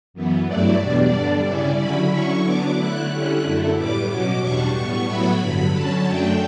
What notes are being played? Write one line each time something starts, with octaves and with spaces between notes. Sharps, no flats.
F#2 E3 B3
G2 F#3 A3 E4 D5
E2 B2 G3 D4 D5
G2 D3 G3 D4
C#3 G3 C#4 E4
D3 F#3 C#4 E4 B5
D3 F#3 C#4 E4 C#6
D3 F#3 B3 D4 D6
D3 A3 E4 F#6
D3 G3 C#4 E4 F#6
F#2 D3 A3 E4
A2 G3 B3 D6
B2 F#3 C#4 D6
E2 B2 G3 D4 C#6
A2 G3 B3 C#6
A2 F#3 B3 E4 B5
G2 D3 F#3 B5
D3 F#3 C#4 A5
F#2 D3 F#3 A3 D4 G5